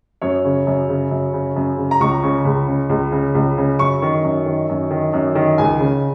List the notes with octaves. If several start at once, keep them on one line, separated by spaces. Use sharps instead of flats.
F#2 C#5
C#3
F#2
C#3
F#2
C#3
F#2
C#3
A#5
C#2 C#6
C#3
C#2
C#3
C#2
C#3
C#2
C#3
F#2 C#6
D#3
F#2
D#3
F#2
D#3
F#2
D#3
C#2 G#5
C#3